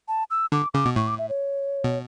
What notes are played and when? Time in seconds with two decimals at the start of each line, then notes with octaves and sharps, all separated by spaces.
0.08 A5
0.31 E6
0.52 D3 D6
0.74 C#3 D6
0.85 B2
0.96 A2 C#6
1.07 D6
1.19 E5
1.29 C#5
1.84 B2